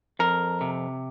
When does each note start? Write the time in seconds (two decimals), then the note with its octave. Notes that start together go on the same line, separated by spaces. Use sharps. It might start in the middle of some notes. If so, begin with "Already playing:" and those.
0.19 F2 A#4
0.61 C3